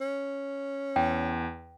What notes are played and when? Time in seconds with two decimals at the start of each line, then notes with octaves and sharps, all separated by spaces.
0.01 C#4
0.96 E2 G5